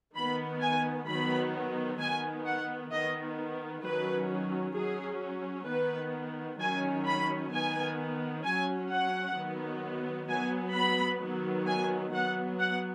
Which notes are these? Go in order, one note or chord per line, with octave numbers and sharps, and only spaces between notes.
D#3 B3 B5
G#5
D#3 F#3 B3 B5
D#3 B3 G#5
F#5
D#3 B3 D#5
D#3 F#3 C#4 B4
F#3 C#4 G#4
D#3 B3 B4
D#3 F#3 C#4 G#5
B5
D#3 B3 G#5
F#3 C#4 G#5
F#5
D#3 F#3 B3
F#3 B3 G#5
B5
D#3 F#3 B3
G#5
F#3 B3 F#5
F#5